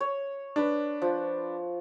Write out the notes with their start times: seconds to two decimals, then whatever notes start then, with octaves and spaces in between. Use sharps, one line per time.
0.01 C#5
0.56 D4 B4
1.02 F3